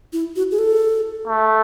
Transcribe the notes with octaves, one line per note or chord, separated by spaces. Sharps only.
E4
F#4
G#4
A4
A3